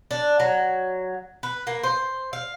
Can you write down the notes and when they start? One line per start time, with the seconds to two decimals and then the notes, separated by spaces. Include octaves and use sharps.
0.11 D4
0.40 F#3
1.43 B4
1.67 A#3
1.83 C5
2.33 F5